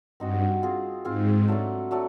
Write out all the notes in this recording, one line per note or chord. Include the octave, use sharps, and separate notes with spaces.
G2 C4 D#4 F#4
C4 F4 G#4
G#2 C4 F4 G#4
F#3 A3 D4
F#3 A3 D4